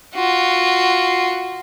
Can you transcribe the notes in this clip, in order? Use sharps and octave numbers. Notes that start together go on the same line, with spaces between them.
F4 F#4